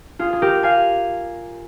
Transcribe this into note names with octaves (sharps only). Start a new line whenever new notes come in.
F4 G#4
G#4
G4 A#4
F5 G#5